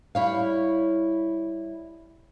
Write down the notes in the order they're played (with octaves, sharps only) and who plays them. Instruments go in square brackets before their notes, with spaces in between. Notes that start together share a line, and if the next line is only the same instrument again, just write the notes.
[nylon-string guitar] G3 E4 C#5 F5